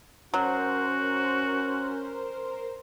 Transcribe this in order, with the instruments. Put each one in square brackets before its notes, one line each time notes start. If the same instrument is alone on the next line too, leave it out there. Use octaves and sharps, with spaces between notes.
[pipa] F#3 [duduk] C#4 [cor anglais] F#4 [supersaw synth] A#4 C5